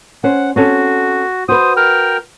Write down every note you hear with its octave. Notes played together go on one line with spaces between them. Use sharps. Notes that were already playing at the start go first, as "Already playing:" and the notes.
C#4 C5 F#5
C4 C#4 F#4 A4
F#4 B4 C5 D#6
A#4 G5 F6